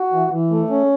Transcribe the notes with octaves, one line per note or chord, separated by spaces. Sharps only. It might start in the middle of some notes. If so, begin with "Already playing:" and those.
Already playing: F#4
E3
E3
A3
C#4